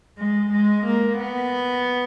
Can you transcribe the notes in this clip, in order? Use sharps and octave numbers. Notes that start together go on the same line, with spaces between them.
G#3
G#3
A#3
B3